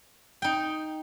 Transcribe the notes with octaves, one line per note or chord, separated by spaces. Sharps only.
D#4 G5